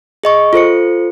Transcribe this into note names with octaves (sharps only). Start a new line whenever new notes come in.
G#4 D#5 C#6
F4 A4 C5 C#7